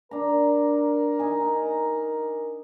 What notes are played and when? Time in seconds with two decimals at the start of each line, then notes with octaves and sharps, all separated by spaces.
0.11 D4 A#4 A#5
1.19 D#4 G#5